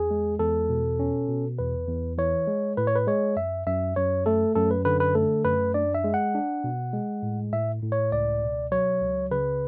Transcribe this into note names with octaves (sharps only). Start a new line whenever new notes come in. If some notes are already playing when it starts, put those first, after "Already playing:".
Already playing: E2 G#4
G#3
E2 A4
B2
C#4
B2
E2 B4
E2
E3 C#5
G#3
A2 B4
C#5
B4
G#3 C#5
F#2 E5
F#2 E5
F#2 C#5
A3 A4
F#2 A4
B4
D3 B4
B4
A3 A4
F#2 B4
D4 D5
E5
G#3
F#5
D4
B2
G#3
A2
A2 E5
A2
C#5
C#2 D5
B2
F#3 C#5
C#2
C#3 B4